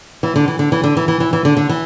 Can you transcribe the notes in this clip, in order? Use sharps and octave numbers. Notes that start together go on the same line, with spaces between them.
E3
D3
E3
D3
E3
D3
E3
E3
E3
E3
D3
D3
E3